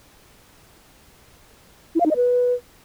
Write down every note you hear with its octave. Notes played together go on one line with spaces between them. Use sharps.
E4
F5
D#4
D#5
B4